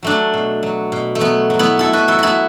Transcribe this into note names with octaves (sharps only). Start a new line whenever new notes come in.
F#3 A3 D4
B2
F#3
B2
A3
F#3 B3
F#3
B3 E4
B2 E4 A4
F#4 B4
F#3 E4 A4
B3 E4 F#4